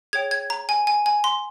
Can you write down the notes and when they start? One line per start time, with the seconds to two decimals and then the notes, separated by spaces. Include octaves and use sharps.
0.13 G#4 C#5 G5 G#6
0.31 G#6
0.50 A#5
0.69 G#5
0.87 G#5
1.06 G#5
1.24 C6